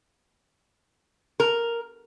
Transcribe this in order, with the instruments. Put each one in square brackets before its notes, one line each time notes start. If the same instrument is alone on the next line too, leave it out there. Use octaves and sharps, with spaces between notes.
[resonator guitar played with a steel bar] A#4